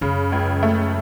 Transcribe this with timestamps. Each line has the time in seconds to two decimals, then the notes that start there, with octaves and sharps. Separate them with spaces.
0.01 F#2 C#3
0.32 C#2
0.63 A3